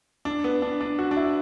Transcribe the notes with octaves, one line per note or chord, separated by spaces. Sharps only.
D4
B3
D4
D4
F#4
D4
E4